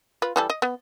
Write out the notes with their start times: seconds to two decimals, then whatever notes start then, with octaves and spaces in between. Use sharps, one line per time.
0.22 F4 B4
0.36 E3 G3 A4
0.50 D#5
0.62 B3